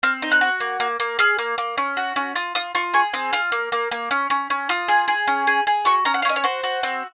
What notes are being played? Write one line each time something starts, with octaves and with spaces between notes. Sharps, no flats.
C4 F6
D#4
F#6
F#4
A#3
A#3
A#3
G#4 F6
A#3
A#3
C#4
F#4
C#4
F4 D#6
F4 D#6
F4 C#6
G#4 C#6
C4 D#6
F4 F6
A#3
A#3
A#3
C#4
C#4
C#4
F4 D#6
G#4
G#4
C#4
G#4
G#4
F#4 C#6
C#4 A#5
F#5
F5
C#4 D#5
C#5
F#4 C5
F#4
C4